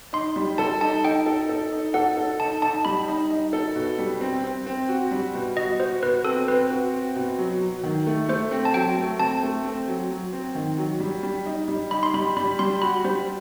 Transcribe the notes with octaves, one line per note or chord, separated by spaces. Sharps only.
D#4 C6
G3
A4 A5
D#4 A5
D#4 G5
A4
A4
D#4
A4 F#5
A4
D#4 A5
D#4 A5
G3 B5
D#4
D#4
A4
B2
G3
C4
C4
C4
F#4
G3
B2
F#4 D#5
F#4 C5
B2 B4
C4 A4
C4 B4
F#4
C4
B2
F#3
F#3
D#3
A3
A3 C5
C4
A5
F#3 G5
A3
C4 A5
A3
C4
F#3
F#3
C4
D#3
F#3
G3
G3
D#4
G3
D#4 B5
C6
G3 B5
G3 B5
G3 C6
F#4 B5
G3 C5